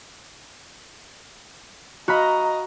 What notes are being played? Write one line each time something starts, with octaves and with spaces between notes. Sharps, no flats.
F#4 D#5 F5 A#5 B5